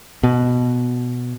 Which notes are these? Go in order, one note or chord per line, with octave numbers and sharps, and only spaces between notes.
B2